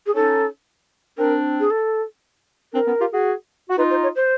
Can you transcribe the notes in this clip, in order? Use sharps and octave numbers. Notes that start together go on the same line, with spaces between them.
G#4
C#4 D#4 A4
C4 D4 A#4
G#4
A4
C4 D4 A#4
B3 C#4
F4 G4
F#4 G#4
F#4
D#4 F4 B4
C5
C#5
C5